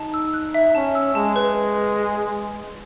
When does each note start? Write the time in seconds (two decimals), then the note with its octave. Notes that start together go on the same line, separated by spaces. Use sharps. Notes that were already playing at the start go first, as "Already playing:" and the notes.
Already playing: D#4 A5
0.14 E6
0.34 F#6
0.54 E5
0.75 C#4 A5
0.95 E6
1.15 G#3 A5
1.36 B4